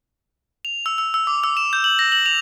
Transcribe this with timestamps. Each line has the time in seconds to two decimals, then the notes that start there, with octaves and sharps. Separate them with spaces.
0.65 F7
0.86 E6
0.98 E6
1.14 E6
1.27 D6
1.44 E6
1.57 E7
1.73 G6
1.84 F#7
1.99 A#6
2.12 F#7
2.26 F7